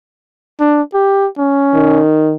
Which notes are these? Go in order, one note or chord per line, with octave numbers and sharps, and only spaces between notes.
D4
G4
C#4
D#3